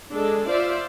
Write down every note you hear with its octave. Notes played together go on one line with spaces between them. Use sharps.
G#3 D4 A4
F4 C5 D5 E5